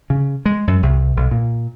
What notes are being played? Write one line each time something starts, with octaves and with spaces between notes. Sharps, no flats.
C#3
G#3
F#2
C2
B1
A#2